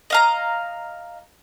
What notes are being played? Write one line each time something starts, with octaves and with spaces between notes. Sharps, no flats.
D#5 F5 A#5